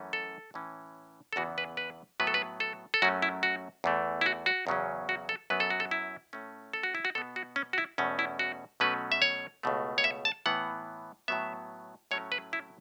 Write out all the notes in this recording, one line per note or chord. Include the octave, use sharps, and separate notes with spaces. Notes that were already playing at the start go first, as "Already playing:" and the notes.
Already playing: F#2 E3 A3 C#4
A4
A2 E3 C#4
A4
E2 C#3 E3 B3 F#4
B4
B4
A2 F#3 B3 B4
A4
B4
A4
A4
F#2 F#3 A3 C#4 F#4
E4
F#4
E2 E3 A3
E4
F#4
F#4
E2 C#3 F#3 C#4
F#4
A4
F#2 F#3 B3 B4
A4
F#4
A4
E4
A2 A3 C#4
A4
F#4
E4
F#4
B2 B3 A4
F#4
C#4
F#4
E4
E2 B2 A3 C#4
E4
F#4
B2 F#3 A3 C#4 B4
E5
C#5
C#2 B2 A3
C#5
E5
A5
A2 E3 B3 F#5
A2 F#3 B3 E5
A2 F#3 A3 C#4 C#5
B4
E4